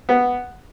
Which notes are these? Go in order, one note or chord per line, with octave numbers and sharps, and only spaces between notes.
B3